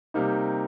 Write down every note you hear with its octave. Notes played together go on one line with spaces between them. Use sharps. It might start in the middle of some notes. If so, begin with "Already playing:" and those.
C3 G3 A#3 D#4